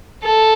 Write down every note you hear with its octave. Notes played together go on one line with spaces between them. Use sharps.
A4